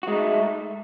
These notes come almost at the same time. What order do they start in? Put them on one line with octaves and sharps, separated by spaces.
F#4 G#3 D#4 A3